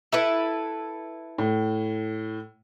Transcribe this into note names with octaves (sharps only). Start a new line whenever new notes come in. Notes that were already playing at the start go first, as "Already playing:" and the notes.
E4 A4 B4
A2